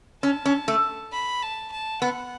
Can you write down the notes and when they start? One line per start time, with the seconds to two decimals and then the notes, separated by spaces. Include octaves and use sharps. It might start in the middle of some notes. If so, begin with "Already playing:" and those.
0.23 C#4 A5
0.46 C#4
0.68 A3
1.13 B5
1.43 A5
1.72 A5
2.02 B3 F#5